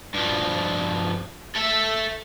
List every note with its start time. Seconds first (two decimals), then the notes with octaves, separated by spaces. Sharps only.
0.14 G2 F3
1.55 A4 E5